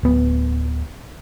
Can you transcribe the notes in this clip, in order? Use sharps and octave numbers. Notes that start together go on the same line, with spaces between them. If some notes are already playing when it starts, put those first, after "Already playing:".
D1 B3